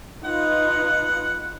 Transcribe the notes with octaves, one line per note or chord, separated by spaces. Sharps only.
D#4 F4 B4 F#5